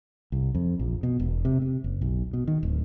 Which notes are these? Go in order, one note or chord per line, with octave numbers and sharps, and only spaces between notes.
C2
F2
A#1
B2
E1
C3
C3
F#1
B1
B2
D#3
D1